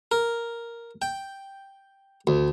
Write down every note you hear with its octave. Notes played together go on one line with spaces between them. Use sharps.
A#4
G5
D2